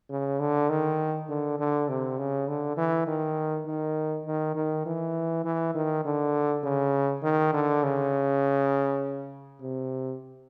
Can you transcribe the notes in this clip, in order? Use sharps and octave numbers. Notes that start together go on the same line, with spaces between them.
C#3
D3
D#3
D3
D3
C3
C#3
D3
E3
D#3
D#3
D#3
D#3
E3
E3
D#3
D3
C#3
D#3
D3
C#3
C3